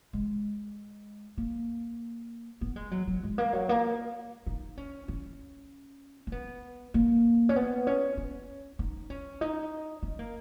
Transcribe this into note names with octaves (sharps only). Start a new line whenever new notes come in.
G#3
A#3
B3
G#3
F#3
F#3
G#3
A#3
F#3
A#3
D#4
C#4
C#4
C#4
B3
A#3
C#4
B3
C#4
C#4
D#4
C#4
D#4
C#4
A#3